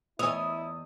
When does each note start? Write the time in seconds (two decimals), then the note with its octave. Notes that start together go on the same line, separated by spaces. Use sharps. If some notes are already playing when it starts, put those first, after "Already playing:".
0.19 E2 E4 C#5 D#5 G#5 D#6 E6